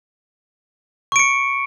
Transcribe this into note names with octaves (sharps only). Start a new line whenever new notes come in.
C#6 C#7 D7